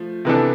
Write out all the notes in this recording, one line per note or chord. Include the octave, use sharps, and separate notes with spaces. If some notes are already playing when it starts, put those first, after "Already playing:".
Already playing: F3 A3
C3 E3 B3 D4 A4